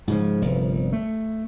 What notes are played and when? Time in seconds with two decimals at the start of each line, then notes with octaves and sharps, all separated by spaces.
0.07 G#2 C#3 F3
0.42 G1 C2 F3
0.93 A3